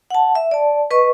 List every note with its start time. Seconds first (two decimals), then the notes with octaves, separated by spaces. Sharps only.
0.10 F#5 A5
0.35 E5
0.51 D5 A5
0.91 B4 D#5 C#6